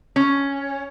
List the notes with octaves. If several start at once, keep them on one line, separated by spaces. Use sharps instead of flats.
C#4